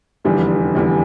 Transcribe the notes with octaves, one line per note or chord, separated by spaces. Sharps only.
F1 E2 D3 G3
F1 E2 D3 G3